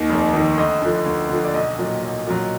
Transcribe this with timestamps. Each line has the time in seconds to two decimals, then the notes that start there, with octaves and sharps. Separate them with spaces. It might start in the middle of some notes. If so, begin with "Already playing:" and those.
Already playing: D#2 D#3 D#5
0.10 F1
0.34 D#2 D#3
0.58 D2 D#5
0.82 D3 F3
1.06 D2
1.30 D3 F3
1.44 D5
1.54 B1 D#5
1.78 A#2 F#3
2.03 B1
2.26 A#2 F#3